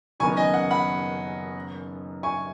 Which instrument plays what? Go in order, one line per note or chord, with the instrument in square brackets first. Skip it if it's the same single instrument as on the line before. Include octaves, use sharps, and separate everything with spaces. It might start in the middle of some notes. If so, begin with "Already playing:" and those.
[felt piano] F#1 F#2 D#3 B3 D#4 [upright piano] G#5 C#6
[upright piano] D#5 G#5
F#5
F#5 B5
G#5 C#6